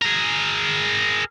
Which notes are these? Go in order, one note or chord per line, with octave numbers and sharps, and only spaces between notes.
G#4 A#4